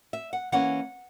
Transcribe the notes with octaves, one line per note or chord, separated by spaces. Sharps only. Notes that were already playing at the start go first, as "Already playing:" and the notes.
E5
F#5
E3 A#3 C#4 F#5